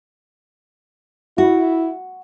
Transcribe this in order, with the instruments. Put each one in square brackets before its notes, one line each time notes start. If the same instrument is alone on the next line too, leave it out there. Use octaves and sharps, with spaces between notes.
[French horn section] E4 [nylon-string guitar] F#4